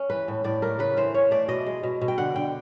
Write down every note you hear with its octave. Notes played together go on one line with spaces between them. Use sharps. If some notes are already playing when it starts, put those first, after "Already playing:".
Already playing: C#4
E3 B4
A2
A2 D5
A3 A#4
C#3 B4
E3 C5
C#4 C#5
A3 D5
B2 D#5
G#3
B2
B2
G5
D3 F#5
D3 G5